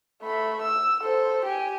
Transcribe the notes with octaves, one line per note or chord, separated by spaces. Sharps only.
A3 B5
E6
A4 C5
G4 G#5